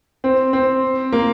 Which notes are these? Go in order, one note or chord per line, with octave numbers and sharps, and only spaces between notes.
C4
C4
A#3